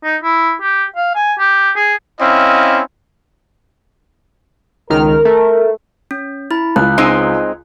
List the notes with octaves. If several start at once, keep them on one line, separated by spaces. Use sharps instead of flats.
D#4
E4
G4
F5
G#5
G4
G#4
C4 C#4 E4 D#5 F5
C#2 D#3 A#4 F6
A3
C#4
E4 B5
C#2 F#6
G#3 C4 D#4